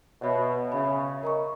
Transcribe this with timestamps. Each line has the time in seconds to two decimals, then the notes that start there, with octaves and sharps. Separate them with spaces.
0.22 B2 C#5 E5 B5
0.72 C#3 C#5 E5 B5
1.23 A#4 D#5 A#5 C#6